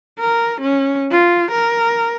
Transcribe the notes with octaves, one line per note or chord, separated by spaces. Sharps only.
A#4
C#4
F4
A#4